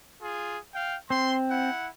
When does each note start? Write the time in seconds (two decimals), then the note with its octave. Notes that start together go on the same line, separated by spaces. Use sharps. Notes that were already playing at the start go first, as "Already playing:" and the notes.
0.20 F4 G#4
0.73 F5 G5
1.10 C4 C6
1.50 E4 F#5